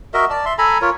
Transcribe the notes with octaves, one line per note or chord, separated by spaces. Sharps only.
F#4 A#4 D#5 E5
D5 A5
E5 C6
A4 G#5 A#5 B5
F4 A#4 C#5